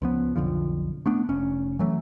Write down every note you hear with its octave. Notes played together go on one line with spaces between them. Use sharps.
C#2 F3 B3
B1 F2 D3 F3
A3 B3 D4
F1 C#4
E3 F#3 A3